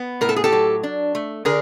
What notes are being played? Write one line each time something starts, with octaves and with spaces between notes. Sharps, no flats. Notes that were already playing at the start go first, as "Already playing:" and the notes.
Already playing: B3
A2 A#4
A4
G#4
G4 A4
F#3
D4
A3
D3 G#4 A#4